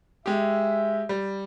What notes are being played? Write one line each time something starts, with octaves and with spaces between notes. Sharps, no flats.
G#3 G4 E5
G3